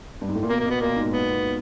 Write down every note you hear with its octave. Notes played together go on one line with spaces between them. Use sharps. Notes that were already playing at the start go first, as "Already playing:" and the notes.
G2
G#2
A2
A#2
B2 A#3
A#3
B2 B3
A#2 A#3
G#2
B3